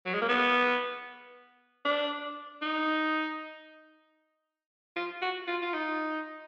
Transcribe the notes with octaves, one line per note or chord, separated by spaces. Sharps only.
F#3
G#3
A#3
B3
D4
D#4
F4
F#4
F4
F4
D#4